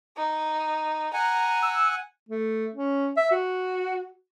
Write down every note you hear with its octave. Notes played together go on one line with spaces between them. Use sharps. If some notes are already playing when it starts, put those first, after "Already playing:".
D#4
F#5 G#5 A#5
E6
A3
C#4
E5
F#4